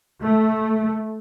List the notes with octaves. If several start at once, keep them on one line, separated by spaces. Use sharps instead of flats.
A3